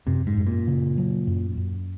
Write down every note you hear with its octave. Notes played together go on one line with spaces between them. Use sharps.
F#2 C3
G#2
F#2
A#2
C#3
F#3
F#2
F#2